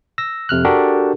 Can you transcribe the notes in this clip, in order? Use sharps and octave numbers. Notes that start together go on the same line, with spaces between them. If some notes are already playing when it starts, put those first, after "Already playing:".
E6 A#6
F2 C3 F6 F#6
D4 F#4 G4 A4 A#4